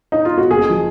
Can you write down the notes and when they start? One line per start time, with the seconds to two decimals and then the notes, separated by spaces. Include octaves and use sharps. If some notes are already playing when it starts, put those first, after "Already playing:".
0.12 D#4
0.25 F4
0.38 F#4
0.50 F#1 G#4
0.69 F3